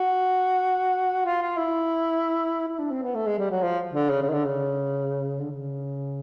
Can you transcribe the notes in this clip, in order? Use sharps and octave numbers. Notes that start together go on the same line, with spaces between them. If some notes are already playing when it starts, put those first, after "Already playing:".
Already playing: F#4
F4
F4
E4
E4
D4
C4
B3
A3
G#3
G3
F#3
F3
D3
C#3
C#3
D#3
D3
C#3
D3
C#3